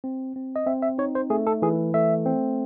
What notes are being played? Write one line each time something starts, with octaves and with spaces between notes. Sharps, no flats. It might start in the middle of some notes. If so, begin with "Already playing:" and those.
C4
C4
D#5
C4 E5
E5
D#4 C#5
C5
A3 G#4
A4
E3 G#4
A3 E5
C4